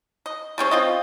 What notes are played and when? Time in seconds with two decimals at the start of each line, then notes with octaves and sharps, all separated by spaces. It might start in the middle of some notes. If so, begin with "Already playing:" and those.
0.26 D#5
0.58 G3 G#3 C#4 C5
0.71 C4 F4 D#5